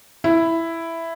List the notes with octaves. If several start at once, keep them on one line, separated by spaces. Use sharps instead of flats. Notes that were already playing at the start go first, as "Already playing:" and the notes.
E4